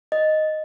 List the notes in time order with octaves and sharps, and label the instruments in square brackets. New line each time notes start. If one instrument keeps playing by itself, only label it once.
[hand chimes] D#5